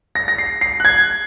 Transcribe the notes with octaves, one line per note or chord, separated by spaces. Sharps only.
A#6
A#6
C7
C7
F#6
G#6